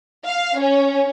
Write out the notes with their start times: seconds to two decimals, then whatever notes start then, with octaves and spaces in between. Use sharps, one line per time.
0.24 F5
0.58 C#4